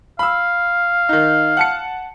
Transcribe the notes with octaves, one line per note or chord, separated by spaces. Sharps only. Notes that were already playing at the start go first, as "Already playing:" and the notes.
F5 B5 E6
D#3 D#4
F#5 A5 C#7